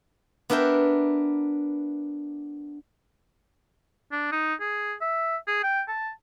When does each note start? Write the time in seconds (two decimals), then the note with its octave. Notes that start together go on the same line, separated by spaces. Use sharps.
0.50 B3 D4 A#4 E5 G5
4.12 D4
4.32 D#4
4.61 G#4
5.01 E5
5.47 G#4
5.63 G5
5.88 A5